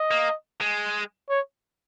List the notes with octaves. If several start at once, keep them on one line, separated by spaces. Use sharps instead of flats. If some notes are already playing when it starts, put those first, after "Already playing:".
Already playing: D#5
A#3
G#3
C#5